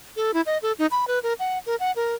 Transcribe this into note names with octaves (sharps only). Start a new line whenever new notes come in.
A4
E4
D#5
A4
D#4
B5
B4
A#4
F#5
A#4
F#5
A#4